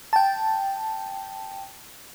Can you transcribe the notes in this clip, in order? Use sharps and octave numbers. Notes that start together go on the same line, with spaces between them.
G5 A5